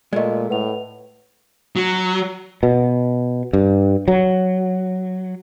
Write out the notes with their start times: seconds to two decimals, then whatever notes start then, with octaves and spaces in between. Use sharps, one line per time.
0.13 A#2 G#3 A3 D5 D#5
0.50 A2 B4 F#5 F7
1.76 F#3
2.63 B2
3.53 G2
4.08 F#3